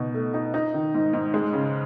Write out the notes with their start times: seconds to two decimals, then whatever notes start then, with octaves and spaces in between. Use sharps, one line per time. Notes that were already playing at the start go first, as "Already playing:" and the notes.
Already playing: B2 D#4
0.14 A3
0.34 D#4
0.54 D#4
0.74 D#3
0.94 G#2
1.13 G#2
1.34 G#3
1.53 C#3